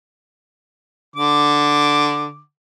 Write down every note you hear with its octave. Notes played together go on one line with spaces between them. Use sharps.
D3 D6